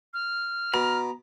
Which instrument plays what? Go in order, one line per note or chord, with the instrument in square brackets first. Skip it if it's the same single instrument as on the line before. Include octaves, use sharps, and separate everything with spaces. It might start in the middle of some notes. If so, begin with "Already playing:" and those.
[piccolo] F6
[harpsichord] B2 [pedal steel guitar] A#5